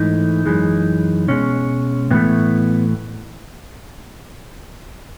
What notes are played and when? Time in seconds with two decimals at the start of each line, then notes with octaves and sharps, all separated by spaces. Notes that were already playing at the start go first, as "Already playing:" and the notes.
Already playing: G#2 E3 A3 D#4
0.46 F#2 E3 G#3
1.28 B2 G#3 C#4
2.11 A2 E3 A3 B3